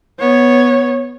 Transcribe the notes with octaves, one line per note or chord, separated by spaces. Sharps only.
B3 C#5